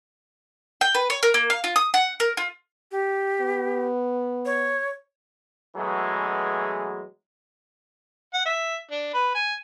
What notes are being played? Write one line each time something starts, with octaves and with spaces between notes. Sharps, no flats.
G5
B4
C#5
A#4
A#3
F5
F4
D#6
F#5
A#4
F4
G4
B3
C#5
B2 E3 F#3 G#3 A3 G#4
F#5
E5
D4
B4
G#5